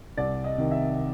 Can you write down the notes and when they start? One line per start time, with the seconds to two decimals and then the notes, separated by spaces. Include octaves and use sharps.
0.17 C2 D5
0.44 D#5
0.58 C3 D#3
0.71 E5